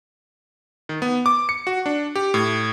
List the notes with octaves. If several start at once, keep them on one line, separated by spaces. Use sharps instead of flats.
D#3
B3
D6
C#7
F#4
D4
G4
A2